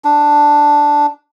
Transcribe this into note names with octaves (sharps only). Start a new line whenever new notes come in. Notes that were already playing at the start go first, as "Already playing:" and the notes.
D4